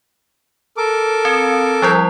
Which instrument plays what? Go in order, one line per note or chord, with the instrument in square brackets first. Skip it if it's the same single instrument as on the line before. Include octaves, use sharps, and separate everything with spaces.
[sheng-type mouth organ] A4 A#4 D6
[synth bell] C4
F3 G3 E4